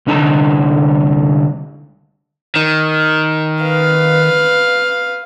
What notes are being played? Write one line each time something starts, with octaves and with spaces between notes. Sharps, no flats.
C2 D3 D#4 A5 A#5
D#3
B4 F5